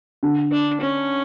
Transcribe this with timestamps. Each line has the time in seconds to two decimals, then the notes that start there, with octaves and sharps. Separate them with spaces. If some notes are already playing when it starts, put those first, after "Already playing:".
0.23 D3
0.51 D4
0.80 C#4